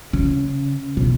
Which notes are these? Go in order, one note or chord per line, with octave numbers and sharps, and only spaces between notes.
C#3
B2